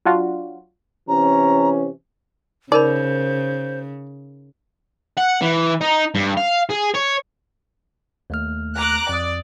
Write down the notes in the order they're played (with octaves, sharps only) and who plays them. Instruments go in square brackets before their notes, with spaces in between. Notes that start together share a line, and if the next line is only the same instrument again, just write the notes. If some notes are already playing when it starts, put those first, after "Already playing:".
[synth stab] F#3 D4 F4 F#4
[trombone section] C3 E3 C#4 [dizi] A#5
[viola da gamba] C#3 [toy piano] D#4 A#4 B5 [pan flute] C5 [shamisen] D5
[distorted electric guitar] F#5
E3
D#4
G2
F5
G#4
C#5
[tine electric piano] D#2 A3 F6
[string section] A#5 D6 F#6
[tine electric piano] F2 D#6 [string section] D5